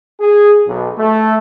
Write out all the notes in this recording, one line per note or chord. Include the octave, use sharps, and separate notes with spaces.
G#4
B1
A3